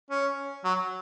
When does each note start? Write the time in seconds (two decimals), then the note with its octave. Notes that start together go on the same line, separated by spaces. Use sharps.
0.11 C#4
0.65 F#3